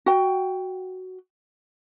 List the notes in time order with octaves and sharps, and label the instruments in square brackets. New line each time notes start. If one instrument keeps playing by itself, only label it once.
[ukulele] F#4 G5